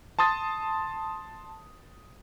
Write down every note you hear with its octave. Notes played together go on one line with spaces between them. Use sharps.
A5 C6 D#6 A6